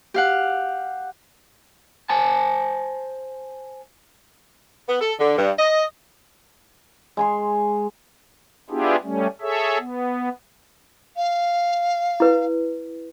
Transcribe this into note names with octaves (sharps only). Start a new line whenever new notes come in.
G4 F5 F#5
C5 G#5 A5
B3
A4
D3
G2
D#5
G#3 G#5 C6
B3 D4 E4 F4 G4 G#4
G3 A3 C#4
G#4 A4 C#5 E5
B3
F5
E4 B4